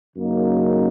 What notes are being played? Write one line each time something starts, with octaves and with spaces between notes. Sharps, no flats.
F#2 C#3 F#3 A#3 D#4